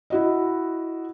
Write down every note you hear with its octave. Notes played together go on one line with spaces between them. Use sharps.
E4 F#4 D#5